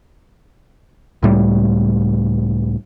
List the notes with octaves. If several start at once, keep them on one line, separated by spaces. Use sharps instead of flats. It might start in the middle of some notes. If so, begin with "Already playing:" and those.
C#2 A2 G3